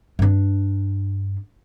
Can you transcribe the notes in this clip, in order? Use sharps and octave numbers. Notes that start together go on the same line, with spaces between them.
G2 D4